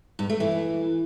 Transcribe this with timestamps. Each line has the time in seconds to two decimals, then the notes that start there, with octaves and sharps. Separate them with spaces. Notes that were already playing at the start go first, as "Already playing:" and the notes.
0.19 G2
0.30 A3
0.40 E3